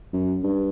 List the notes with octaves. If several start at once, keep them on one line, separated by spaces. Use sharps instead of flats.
F#2
G2